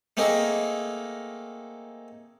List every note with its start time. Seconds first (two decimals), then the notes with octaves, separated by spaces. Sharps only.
0.17 A3 A#3 C4 D#4 G#4 A#4